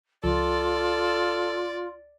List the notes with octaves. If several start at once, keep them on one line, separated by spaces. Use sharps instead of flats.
C#2 F3 F4 A4 D5